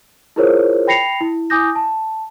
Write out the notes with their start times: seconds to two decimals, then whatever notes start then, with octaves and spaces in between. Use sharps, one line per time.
0.36 E4 F4 G#4 A#4 C5 C#5
0.87 G5 B5 A#6 C7 C#7 F7
1.21 E4
1.50 E4 G#5 D6 D#6 G6 A#6
1.75 A5